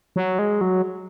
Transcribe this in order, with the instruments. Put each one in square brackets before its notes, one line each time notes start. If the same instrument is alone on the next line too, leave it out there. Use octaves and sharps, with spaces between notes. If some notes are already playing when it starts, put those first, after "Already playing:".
[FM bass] F#3
G#3
F#3